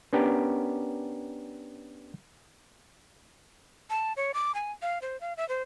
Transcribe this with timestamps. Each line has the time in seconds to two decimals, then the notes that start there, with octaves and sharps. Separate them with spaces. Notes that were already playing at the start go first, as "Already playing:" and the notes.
0.13 B3 C#4 D4 G4 A#4
3.90 A5
4.17 C#5
4.34 D6
4.55 G#5
4.82 F5
5.02 C5
5.21 F5
5.37 E5
5.49 C5